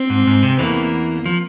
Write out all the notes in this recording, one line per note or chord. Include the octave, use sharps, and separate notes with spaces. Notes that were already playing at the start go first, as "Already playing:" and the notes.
Already playing: C4
G#2
G#2
C3
E2 E3 A#3
F3